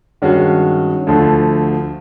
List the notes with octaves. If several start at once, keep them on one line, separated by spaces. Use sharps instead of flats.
G2 D#3 G#3 C#4 F#4
D2 D3 F3 A3